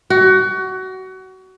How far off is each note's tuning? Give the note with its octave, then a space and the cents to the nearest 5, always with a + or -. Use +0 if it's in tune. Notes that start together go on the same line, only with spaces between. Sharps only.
F#4 +25